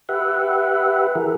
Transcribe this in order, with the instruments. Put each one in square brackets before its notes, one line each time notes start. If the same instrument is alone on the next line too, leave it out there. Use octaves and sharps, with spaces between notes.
[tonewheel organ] G4 B4 E5 F#5
E3 G#4 A#4